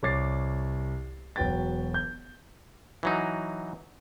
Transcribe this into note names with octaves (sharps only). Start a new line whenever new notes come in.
C2 C#5 D6 A6 C7
E1 F#3 B4 G5 A6
G6
E3 F#3 D#4